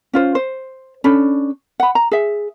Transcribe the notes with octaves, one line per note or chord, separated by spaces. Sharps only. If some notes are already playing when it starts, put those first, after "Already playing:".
C#4 F4 C5
C5
C#4 D4 A4 B5
F#5 B5
A#5
G#4 E5